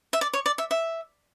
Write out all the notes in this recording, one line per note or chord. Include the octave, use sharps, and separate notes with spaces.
E5
D5
C#5
D5
E5
E5